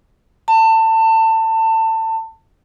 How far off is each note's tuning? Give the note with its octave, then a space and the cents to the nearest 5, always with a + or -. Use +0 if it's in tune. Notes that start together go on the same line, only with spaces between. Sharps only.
A5 +25